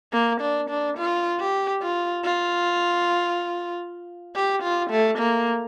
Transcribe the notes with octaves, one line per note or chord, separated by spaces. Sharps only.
A#3
D4
D4
F4
G4
F4
F4
G4
F4
A3
A#3